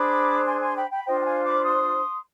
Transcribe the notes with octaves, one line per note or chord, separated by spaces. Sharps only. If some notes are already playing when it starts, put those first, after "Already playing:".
Already playing: D4 G#4 C5 B5 D6
G#5 C6
G#5 C6
G5 B5
G5 B5
D4 F4 C5 D#5 G5
G5
F5 G#5
B5 D6
C6 D#6